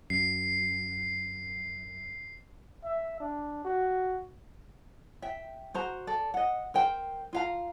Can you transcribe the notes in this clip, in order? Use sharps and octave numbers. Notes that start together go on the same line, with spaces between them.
F#2 C7
E5
D4
F#4
E5 G5
F#4 C5 A#5
A4 D5
D#5 F#5
A#4 C5 G5
F4 F5 A#5